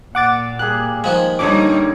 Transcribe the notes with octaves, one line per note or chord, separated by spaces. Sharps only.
A#2 F#5 D6 A6
G3 A#3 G#4 F#6
D#3 F3 G#3
A#2 D3 G3 D#4 C#5 D6